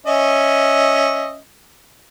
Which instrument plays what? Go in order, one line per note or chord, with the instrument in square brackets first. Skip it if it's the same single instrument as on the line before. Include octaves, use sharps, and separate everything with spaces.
[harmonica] C#4 D#5 E5